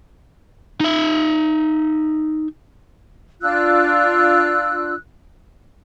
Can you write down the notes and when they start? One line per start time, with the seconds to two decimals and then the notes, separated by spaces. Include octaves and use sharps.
0.80 D#4 E5
3.42 D4 F4 E6 F#6